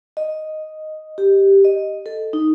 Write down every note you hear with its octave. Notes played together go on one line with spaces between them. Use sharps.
D#5
G4
D#5
A4
D#4